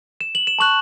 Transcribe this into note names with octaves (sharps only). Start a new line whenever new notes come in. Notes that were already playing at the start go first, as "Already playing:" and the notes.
E7
F#7
E7
A5 C#6 F#6 F#7